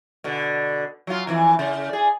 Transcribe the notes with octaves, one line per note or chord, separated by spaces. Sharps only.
B2 D3
F#3 F4
F2 E3
C#3
G#4 D5